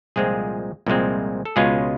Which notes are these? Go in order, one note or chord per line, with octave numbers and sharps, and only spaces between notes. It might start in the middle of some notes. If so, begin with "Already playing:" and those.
C2 A#2 F3 G#3 C4 G#4
C2 A#2 F3 G#3 C4
A4
C#2 B2 G#3 C#4 F4 G#4